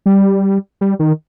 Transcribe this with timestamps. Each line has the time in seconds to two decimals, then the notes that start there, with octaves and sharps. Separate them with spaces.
0.06 G3
0.81 G3
0.99 D#3